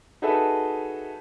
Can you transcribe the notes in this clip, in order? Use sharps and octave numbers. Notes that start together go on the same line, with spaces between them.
D#4 F#4 G#4 A4 B4 E5